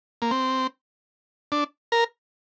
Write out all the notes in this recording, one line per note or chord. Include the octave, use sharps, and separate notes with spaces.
A#3
C4
D4
A#4